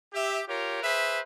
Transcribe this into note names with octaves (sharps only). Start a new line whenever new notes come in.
G4 E5
F4 G4 A#4 C#5
G#4 B4 C5 E5